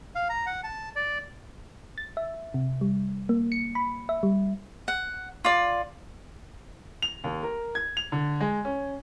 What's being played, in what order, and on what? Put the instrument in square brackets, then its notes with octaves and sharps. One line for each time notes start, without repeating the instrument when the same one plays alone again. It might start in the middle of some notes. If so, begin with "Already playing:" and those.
[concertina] F5
A#5
F#5
A5
D5
[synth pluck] A6
E5
C3
G3
A#3
C#7
B5
E5
G3
[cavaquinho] F#5
F4 D5
[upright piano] F7
D#2
A#4
G#6
F7
D3
G#3
C#4